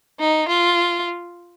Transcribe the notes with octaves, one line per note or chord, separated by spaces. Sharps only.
D#4
F4